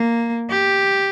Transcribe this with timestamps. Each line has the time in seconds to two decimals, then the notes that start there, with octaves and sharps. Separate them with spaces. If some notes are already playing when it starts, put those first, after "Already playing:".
Already playing: A#3
0.50 G4